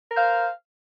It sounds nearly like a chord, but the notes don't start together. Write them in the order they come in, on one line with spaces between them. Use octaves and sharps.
A#4 C5 F5